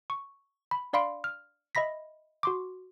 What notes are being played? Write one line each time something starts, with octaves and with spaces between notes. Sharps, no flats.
C#6
B5
D4 D5 F5 B5 C6 D7
F6
D#5 E5 B5 A#6 B6
F#4 C6 D6